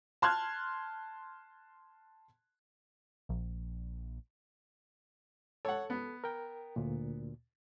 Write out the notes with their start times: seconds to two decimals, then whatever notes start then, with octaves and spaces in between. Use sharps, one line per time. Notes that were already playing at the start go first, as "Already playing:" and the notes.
0.22 A5 C6 F6 F#6 G#6
3.29 A#1
5.65 A4 C#5 F#5
5.90 B3
6.24 A#4 G5
6.76 D2 A#2